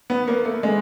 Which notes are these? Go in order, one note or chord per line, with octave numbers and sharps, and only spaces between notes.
B3
A#3
A3
G#3